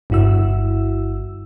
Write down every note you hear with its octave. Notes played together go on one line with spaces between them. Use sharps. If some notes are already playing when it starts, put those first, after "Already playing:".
G1 G2 E4 F#4 E6